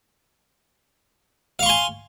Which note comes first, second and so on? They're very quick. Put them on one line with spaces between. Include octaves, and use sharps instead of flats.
F5 C#6 C6 G#5